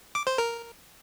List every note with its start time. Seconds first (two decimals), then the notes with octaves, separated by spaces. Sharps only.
0.15 D6
0.27 C5
0.38 A#4